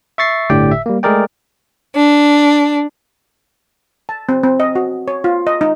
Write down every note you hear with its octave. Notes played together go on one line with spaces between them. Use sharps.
E5 C#6 A6 C7
G1 A2 D3 G4 D5 G5
E5
G3 A#3
G#3 A3 G#4 A#4 D5 G5
D4
A5
C4
C4
D#5
F#4
C#5
F4
D#5
D#4